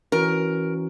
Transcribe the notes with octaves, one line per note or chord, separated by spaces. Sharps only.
E3 C#4 F#4 A#4